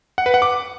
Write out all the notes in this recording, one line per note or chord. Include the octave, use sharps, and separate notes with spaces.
F#5
B4
F#5
D6